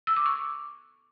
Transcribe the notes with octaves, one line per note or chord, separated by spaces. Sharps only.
E6
D6
C#6